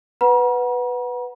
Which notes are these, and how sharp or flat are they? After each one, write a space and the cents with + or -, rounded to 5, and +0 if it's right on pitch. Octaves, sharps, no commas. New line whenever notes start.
B4 +0 F#5 +0 A#5 +45